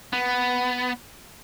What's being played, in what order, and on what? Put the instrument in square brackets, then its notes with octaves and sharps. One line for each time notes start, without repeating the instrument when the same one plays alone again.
[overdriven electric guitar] B3